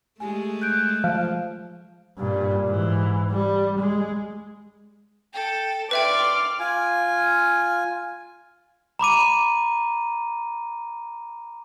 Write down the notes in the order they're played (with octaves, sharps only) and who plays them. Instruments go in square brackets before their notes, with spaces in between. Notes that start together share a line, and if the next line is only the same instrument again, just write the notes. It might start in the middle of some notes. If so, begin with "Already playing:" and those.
[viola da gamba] G#3 A3 [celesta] G4 G#5
[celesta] F#6 G6 D7
[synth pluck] F3
[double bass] G2 A#2
G#2 E3
G3
G#3
[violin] A4 [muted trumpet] G5
[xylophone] B4 E5 G5 [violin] D5 [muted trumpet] C6 [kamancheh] D6 F6
[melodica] F4 G#5
[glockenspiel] A#5 B5 D6 D#7